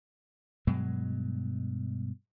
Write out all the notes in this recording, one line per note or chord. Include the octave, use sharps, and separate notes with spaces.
G2 B2 F#3 G#3